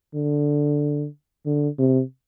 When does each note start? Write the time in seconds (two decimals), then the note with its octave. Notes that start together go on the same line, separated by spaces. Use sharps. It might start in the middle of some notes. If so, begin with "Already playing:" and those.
0.15 D3
1.46 D3
1.79 C3